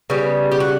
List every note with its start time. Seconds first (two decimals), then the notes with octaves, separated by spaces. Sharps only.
0.10 C#3 G3 B3
0.52 G4
0.60 F#4